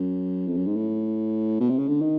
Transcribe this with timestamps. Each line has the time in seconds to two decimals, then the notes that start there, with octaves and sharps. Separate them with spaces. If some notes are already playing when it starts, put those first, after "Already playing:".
Already playing: F#2
0.47 F2
0.57 F#2
0.66 G#2
0.76 A2
1.60 B2
1.69 C3
1.78 C#3
1.88 D3
2.01 D#3